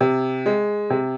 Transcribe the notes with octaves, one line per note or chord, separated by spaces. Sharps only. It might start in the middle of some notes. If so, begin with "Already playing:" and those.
C3
G#3
C3